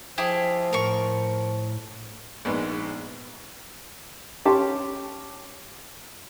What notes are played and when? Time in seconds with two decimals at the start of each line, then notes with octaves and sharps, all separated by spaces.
0.18 F3 E4 G4 G#4
0.73 A2 A#4 C#6
2.45 A#1 G#2 B3
4.45 C#4 G4 C#5 A5 C6